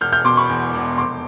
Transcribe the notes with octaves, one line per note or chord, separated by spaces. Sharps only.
E1 F6 G6
F6 G6
B2 C6 D6
B5 C#6
E2
E1
F1 C6 D6